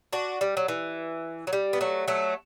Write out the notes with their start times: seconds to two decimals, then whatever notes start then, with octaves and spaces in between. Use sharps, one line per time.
0.13 D4 F#4
0.41 G3
0.57 F#3
0.68 E3
1.47 F#3
1.53 G3
1.73 B3
1.81 F#3 A3
2.08 F#3 A3